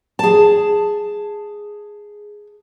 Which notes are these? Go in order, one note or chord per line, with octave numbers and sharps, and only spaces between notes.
G#4 A5